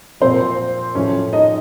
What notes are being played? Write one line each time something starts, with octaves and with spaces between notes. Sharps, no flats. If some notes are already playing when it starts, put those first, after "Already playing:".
A#2 F3 C4 C5
A2 F3 C#4 C#5
D#4 D#5